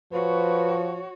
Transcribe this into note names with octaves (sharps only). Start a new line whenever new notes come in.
F3 F#4 B4 C#5